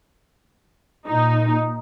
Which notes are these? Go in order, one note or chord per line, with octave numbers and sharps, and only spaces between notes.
A#2 D#4